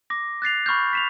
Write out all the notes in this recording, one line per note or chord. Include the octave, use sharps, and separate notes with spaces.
D6 A#6
F#6 A6 C7 F7
B5 C#6 F6 G6
B6 E7 F7